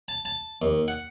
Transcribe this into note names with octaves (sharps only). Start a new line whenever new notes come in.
A5
A5
D#2
F#5